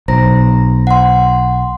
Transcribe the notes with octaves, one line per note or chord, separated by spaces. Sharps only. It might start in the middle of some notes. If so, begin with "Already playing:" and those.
B1 C5 A#5 A#6
F#5 C6